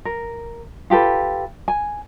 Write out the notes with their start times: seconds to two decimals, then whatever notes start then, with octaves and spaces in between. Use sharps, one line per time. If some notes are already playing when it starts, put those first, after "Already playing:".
0.05 A#4
0.90 F4 G4 A4 B4
1.68 G#5